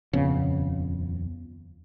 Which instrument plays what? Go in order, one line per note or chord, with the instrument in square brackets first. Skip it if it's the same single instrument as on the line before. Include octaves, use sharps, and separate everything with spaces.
[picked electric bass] D#1 F2 B3 [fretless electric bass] C#3